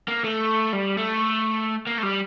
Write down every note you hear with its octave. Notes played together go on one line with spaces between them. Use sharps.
A#3
A3
G3
A3
A#3
A3
G3